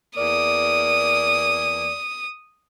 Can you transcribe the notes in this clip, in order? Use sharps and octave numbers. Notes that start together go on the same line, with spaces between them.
E2 A#3 D5 D#6